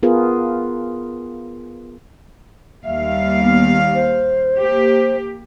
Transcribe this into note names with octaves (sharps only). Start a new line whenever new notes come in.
B3 F4 G#4 A#4 B4
D#2 G3 E5 F5
B3
C5
A#3 G4